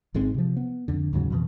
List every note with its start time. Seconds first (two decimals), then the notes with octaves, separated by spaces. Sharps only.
0.14 G#1 G#2 G#3 C4
0.34 C3 F3
0.57 B3
0.88 F2 D3
1.13 D#2 G#2 C#3 F#3
1.30 F2 B2 E3